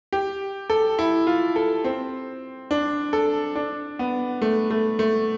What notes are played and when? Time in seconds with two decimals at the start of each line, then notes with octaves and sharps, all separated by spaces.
0.13 G4
0.70 A4
0.99 E4
1.27 F4
1.56 A4
1.84 C4
2.71 D4
3.13 A4
3.55 D4
3.99 B3
4.42 A3
4.71 A3
4.99 A3